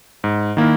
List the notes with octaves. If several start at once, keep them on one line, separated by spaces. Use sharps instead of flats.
G#2
D#3 A#3 E4